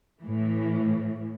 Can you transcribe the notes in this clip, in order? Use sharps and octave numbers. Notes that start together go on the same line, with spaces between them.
A2 E3